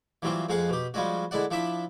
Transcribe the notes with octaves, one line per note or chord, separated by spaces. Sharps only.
E3 F#3 G3 C4 F4
F2 F3 G#3 G#4 F5 F#5
B2 G4
F3 G3 G#3 C#4 F#4
D3 G#3 E4 D5 F#5
F3 D4 E4 E5 B5 D6